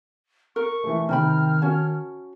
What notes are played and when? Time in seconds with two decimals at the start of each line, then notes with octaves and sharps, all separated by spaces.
0.56 A#4 C#6
0.84 E3 A3
1.09 C3 D#3 D#4 G5 B5 F6
1.62 C#4 F#4 C#5 A5